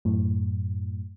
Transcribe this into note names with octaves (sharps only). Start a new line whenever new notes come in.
F#2 A2